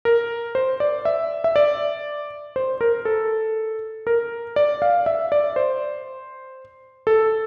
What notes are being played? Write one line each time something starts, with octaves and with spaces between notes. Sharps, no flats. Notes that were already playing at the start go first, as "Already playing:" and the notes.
A#4
C5
D5
E5
E5
D5
C5
A#4
A4
A#4
D5
F5
E5
D5
C5
A4